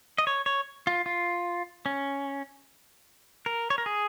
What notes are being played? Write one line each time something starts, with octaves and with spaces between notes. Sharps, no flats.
D#5
C#5
C#5
F4
F4
C#4
A#4
C#5
A#4
G#4